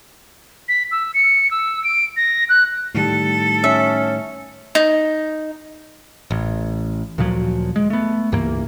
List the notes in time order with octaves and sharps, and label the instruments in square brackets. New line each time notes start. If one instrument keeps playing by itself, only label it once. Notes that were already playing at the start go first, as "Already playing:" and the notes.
[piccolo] B6
E6
C#7
E6
D7
A#6
F#6
[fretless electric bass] A2 D#3 G3 [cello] A4
[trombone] C#4 [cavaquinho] E5
[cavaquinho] D#4
[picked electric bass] A1
D2 A#2 F3 F#3
G#3
A3 B3
C#2 G2 E3 A#3